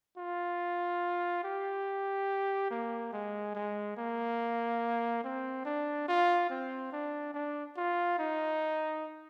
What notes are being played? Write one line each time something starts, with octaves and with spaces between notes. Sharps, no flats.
F4
G4
A#3
G#3
G#3
A#3
C4
D4
F4
C4
D4
D4
F4
D#4